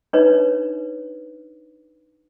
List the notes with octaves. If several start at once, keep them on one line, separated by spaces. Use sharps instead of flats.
D4 D#4 B4 C#5